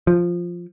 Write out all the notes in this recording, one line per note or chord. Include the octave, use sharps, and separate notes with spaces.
F3